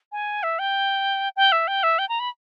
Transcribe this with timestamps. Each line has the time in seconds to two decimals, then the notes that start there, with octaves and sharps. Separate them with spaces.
0.12 G#5
0.43 E5
0.59 G5
1.36 G5
1.52 E5
1.68 G5
1.83 E5
1.99 G5
2.09 A#5
2.20 B5